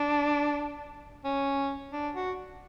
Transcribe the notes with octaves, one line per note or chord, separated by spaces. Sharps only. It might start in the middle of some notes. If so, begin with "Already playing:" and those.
Already playing: D4
C#4
D4
F#4